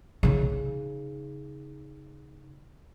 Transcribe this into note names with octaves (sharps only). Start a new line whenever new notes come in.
C#3 D#4